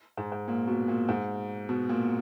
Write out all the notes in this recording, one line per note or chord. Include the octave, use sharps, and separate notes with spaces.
G#2
G#2
A#2
B2
A#2
G#2
B2
A#2